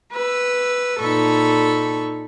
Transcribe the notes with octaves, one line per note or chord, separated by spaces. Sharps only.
B4 E6
A#2 D#4 A4 B5 C#6